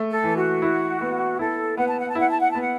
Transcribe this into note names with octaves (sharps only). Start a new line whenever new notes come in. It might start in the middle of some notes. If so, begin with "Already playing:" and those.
Already playing: A3
A4
E3
F#4
E4
B3
E4 A4
B3 F#5
A5
F#5
A5
E4 F#5
A5
F#5
B3 A5
F#5